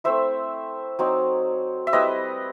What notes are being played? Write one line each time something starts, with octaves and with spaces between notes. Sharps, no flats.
A3 C4 E4 C5 E5
F#3 C4 D#4
E5
G3 C4 E4 B4 D#5